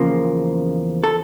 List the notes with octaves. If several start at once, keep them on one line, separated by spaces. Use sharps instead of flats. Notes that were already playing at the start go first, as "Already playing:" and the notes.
Already playing: E2 C#3 F3 A#3
A4